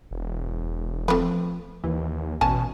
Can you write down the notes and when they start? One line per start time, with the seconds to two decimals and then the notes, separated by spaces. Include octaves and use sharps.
0.11 E1
1.08 F3 A3 C4 B4
1.84 D#2 E3
2.41 A1 B2 C#4 G#5 A5